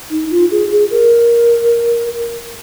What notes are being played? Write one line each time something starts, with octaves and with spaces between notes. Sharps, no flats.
D#4
F4
G#4
G#4
A#4